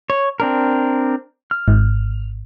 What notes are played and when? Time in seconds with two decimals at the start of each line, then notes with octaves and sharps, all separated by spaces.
0.10 C#5
0.40 C4 D4 A#4
1.51 F6
1.68 G#1 G#2